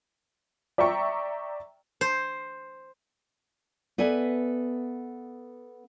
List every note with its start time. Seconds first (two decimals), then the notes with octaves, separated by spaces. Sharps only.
0.78 D5 E5 G5 A#5 C#6
2.01 C5
3.98 B3 A4 B4 D5 E5 G#5